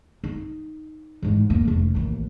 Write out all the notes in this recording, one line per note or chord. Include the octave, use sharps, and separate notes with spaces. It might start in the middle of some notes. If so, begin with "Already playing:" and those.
D#4
A1 G#2
E1 A#3
F1 C#4
A1 D#2